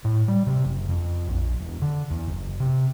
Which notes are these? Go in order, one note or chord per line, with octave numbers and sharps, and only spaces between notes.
A2
G3
C3
F#1
F2
A#1
E1
D3
E2
F#1
C3